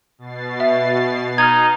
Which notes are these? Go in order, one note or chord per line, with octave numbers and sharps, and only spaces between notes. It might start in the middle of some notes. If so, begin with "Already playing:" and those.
B2 A6 C7
E5
D#4 F6 G#6